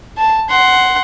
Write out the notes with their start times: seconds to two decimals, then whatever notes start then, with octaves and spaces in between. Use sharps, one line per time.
0.17 A5
0.50 F#5 C6